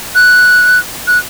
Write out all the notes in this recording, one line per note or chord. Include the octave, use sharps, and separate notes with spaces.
F#6
F#6